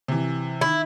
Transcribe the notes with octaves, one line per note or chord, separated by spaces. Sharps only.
C3 E3
D#3 E4